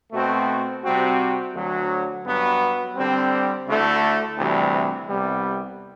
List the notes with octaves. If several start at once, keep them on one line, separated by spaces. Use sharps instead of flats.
B2 A3 C4 F#4
C3 G3 C4 F#4
D2 D3 F#3
G2 F#3 B3
D3 G3 C4
D2 D3 A3 E4
D2 C3 E3 G3
C2 C3 G3 B3